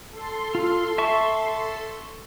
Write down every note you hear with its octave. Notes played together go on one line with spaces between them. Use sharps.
A4 C6
F4
E5 A5 C#6